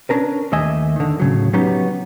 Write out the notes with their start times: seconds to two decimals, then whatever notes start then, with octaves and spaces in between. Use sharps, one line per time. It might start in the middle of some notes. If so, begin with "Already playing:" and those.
0.09 C#4 D4 A#4 B4
0.53 D#2 A3 D#5 E5 G#5
0.96 D3 D#3
1.20 A2 C#3 F#3
1.53 F#3 B3 C#4 D#4 G4